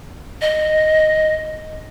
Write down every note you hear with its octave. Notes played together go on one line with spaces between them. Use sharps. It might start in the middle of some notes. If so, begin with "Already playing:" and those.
D#5